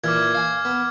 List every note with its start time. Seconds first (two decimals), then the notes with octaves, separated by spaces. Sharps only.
0.04 A#2 E3 D6 F6 G#6
0.35 F5 G#5
0.65 B3